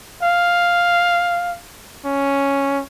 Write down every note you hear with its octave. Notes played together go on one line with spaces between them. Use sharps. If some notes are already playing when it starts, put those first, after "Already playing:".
F5
C#4